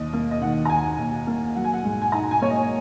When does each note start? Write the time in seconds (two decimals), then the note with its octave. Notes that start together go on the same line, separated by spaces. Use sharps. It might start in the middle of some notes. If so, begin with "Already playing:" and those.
Already playing: D#2 D#5
0.13 A#3
0.31 D#5
0.41 D#3 F#5
0.65 A#5
0.70 D#2 G#5
0.84 G#5
0.99 D#2
1.27 A#3
1.55 F#3 F#5
1.64 G#5
1.73 F#5
1.84 G#2
2.02 G#5
2.12 D#4 A#5
2.31 G#5
2.41 A#3 C#5
2.50 D#5